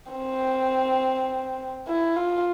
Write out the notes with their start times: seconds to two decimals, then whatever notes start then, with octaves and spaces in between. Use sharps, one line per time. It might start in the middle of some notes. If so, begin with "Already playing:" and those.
0.11 C4
1.87 E4
2.16 F4